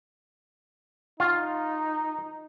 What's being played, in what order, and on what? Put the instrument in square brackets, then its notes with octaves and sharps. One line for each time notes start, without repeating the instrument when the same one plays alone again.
[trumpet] D#4 [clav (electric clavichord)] F4